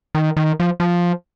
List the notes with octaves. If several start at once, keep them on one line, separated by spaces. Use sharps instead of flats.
D#3
D#3
F3
F3